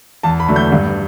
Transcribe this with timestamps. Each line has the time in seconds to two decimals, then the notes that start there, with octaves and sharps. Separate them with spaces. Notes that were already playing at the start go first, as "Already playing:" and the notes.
0.23 E2 A5
0.40 B5
0.48 D3 F#3 A3
0.56 G6
0.72 G2